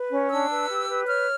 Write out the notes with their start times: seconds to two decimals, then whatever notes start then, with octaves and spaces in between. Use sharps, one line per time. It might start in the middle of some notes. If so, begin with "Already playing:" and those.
Already playing: B4
0.12 C#4
0.30 D4 E6
0.49 B4
0.69 G4
0.89 B4
1.07 C#5 F6